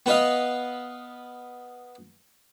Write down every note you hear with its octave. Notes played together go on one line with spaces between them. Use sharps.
B3 B4 D#5 F5